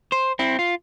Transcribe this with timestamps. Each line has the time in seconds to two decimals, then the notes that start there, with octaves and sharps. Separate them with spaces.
0.12 C5
0.39 C4 E4
0.59 F4